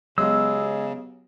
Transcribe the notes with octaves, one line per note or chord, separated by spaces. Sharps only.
C#3 F#3 G#3 B3 G4 D#5 E6